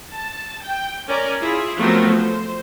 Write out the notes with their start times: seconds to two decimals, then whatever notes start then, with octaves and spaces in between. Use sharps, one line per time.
0.12 A5
0.63 G5
1.08 C#4 A#4 D5
1.41 E4 F4 G#4
1.77 F3 F#3 A3 B3 C4 A#4
2.16 C5